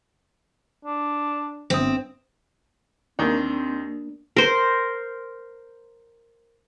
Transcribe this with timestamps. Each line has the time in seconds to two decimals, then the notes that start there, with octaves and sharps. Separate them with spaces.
0.85 D4
1.70 G1 C4 D#6
3.19 D#2 D#3 A#3 C4 D4
4.36 A#4 C5